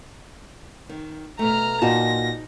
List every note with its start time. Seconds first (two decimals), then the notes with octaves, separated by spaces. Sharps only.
0.89 D#3
1.39 B2 A3 A#5 F6
1.82 A#2 D#4 F4 F#4 D#5 A5 A#6